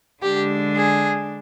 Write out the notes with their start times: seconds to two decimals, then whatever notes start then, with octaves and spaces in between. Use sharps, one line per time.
0.22 D3 G#3 D4 G4
0.75 G#4